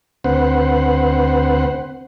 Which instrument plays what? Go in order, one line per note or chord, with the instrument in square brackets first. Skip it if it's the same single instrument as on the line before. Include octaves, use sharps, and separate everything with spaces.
[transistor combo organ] D2 C4 B4 C5 F#5